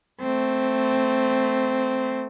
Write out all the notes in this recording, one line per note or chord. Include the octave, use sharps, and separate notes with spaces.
A3 C4